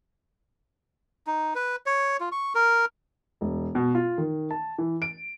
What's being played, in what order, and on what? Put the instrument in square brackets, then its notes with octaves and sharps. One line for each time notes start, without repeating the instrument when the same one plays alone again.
[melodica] D#4
B4
C#5
F4
C#6
A#4
[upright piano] E1
B2
F4
D#3
A5
E3
D7